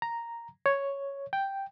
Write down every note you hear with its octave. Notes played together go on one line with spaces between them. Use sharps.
A#5
C#5
G5